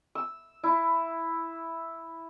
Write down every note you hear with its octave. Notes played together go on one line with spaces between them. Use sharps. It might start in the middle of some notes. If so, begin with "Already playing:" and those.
E6
E4